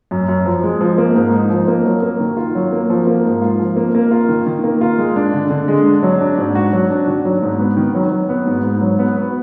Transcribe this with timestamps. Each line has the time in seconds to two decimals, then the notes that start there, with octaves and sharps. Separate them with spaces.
0.11 F#2
0.28 F#2
0.46 F3
0.63 G#3
0.81 F3
0.98 A#3
1.15 G#2
1.32 D#4
1.50 F3
1.68 A#3
1.85 F#3
2.02 A#3
2.20 D#3
2.37 F4
2.55 F#3
2.72 A#3
2.90 F3
3.07 A#3
3.25 G#2
3.42 F4
3.59 F3
3.76 A#3
3.95 A#3
4.11 F4
4.29 D#3
4.46 D#3
4.64 A#3
4.81 F4
4.98 G#3
5.16 D4
5.34 D3
5.51 D3
5.68 G#3
5.85 D4
6.03 F#3
6.21 D4
6.38 G#2
6.55 F#4
6.73 F#3
6.90 D4
7.07 D#3
7.25 F#3
7.42 G#2
7.60 B3
7.77 D#3
7.95 F#3
8.12 F#3
8.29 B3
8.47 G#2
8.64 G#2
8.81 F#3
8.99 B3
9.17 B3